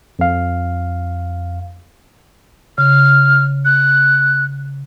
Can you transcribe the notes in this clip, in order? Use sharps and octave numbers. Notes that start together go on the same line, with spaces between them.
F2 F5
C#3 F6
F#6